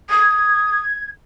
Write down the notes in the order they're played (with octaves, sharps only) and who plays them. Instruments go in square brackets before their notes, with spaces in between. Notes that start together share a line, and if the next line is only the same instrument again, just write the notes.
[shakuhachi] D#6 [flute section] G#6